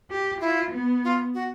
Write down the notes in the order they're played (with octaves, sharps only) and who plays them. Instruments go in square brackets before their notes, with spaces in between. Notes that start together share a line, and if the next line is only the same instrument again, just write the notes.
[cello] G4
[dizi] E4 [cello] F4
[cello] B3
[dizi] F4
F#4